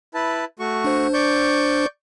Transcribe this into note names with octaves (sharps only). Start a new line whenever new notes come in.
E4 B4 A5
A3 F#4 C#6
D4 C5
D5 C#6 G6